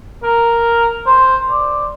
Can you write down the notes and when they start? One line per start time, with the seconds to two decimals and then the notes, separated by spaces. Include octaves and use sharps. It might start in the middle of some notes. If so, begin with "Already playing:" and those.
0.24 A#4
1.07 C5
1.51 D5